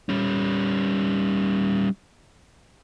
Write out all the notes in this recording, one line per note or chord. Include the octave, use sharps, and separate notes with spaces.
G3 C#4